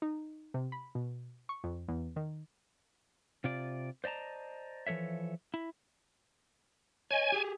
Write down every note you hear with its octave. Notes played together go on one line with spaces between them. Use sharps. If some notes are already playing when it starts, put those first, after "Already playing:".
D#4
C3
B5
B2
C#6
F2
E2
D#3
C3 F4 D5
C5 D5 D#5 A5 A#5
E3 F3 A4 C#5 E5
E4
C#5 D#5 G#5
G4 G#4